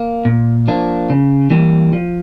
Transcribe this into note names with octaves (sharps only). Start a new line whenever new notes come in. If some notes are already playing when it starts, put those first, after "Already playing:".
Already playing: A#3
A#2
F3 A#3 D4
C#3
E3 G3 A#3
F3